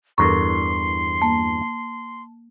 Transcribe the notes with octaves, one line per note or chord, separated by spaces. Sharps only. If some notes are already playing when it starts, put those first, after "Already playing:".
E2 G2 A4 A#4 A#5 C6 C#6
A#3 A5